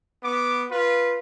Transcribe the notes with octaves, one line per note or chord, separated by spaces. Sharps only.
B3 D6
F4 B4